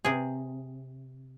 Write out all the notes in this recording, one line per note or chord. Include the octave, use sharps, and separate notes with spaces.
C3 G#4